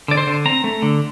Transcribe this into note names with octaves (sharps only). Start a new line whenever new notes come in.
D3 D5
C5
D3
C4 A#5
A3
D3